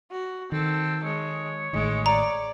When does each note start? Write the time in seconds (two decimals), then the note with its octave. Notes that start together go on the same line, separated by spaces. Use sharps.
0.11 F#4
0.52 D#3 C4 A4
1.04 G#3 C#5
1.73 A1 A2 D#3 G#3
2.06 D5 A#5